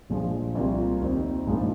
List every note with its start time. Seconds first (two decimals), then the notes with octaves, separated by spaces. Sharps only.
0.10 A#1 A#2 F3 G#3
0.55 C2 C3 F3 A#3 F4
1.01 D#2 D#3 C4 D#4
1.47 A#1 G#2 F3 A#3